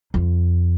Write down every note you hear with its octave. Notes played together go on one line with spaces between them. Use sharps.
F2